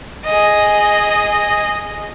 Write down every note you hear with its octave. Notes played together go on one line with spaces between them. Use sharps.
G#4 D#5